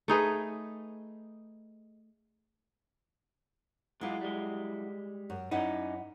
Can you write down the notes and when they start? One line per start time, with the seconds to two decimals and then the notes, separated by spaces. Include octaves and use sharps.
0.08 A3 D#4 G#4 B4
4.01 F#3 G#3 E4 F4
4.21 G3 G#3
5.30 F#2
5.51 F#2 C#4 D#4 E4 F#5